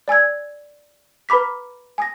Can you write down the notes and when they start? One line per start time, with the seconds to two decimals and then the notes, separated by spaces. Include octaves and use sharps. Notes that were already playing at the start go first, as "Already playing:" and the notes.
0.08 D5 G#5 E6 G#6
1.29 B4 A#5 B5 D6 B6
1.98 G#5 D#6 A#6